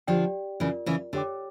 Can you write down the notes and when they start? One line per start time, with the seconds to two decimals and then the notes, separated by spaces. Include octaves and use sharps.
0.07 D3 F3 G4 D5 G5
0.60 C#3 E3 F4 A#4 D5
0.86 C#3 E3
1.13 D3 G4 C#5 G5 D6